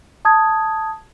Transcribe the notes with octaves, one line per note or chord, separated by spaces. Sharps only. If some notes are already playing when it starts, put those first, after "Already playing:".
A5 D#6 G#6